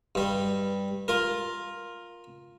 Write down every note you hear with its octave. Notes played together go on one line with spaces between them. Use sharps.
G2 G3
F4 A#4